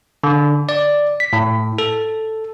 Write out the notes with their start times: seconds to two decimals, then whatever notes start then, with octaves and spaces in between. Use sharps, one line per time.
0.24 D3
0.69 D5
1.20 B6
1.33 A2
1.78 A4